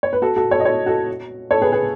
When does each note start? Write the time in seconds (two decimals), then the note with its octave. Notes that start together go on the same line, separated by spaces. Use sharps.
0.03 C#5
0.13 B4
0.22 F#4 A4
0.36 F#4 A4
0.51 A4 C#5
0.60 D#5
0.65 A4 C#5
0.86 F#4 A4
1.51 A4 C#5
1.62 G#4 B4
1.72 G#4 B4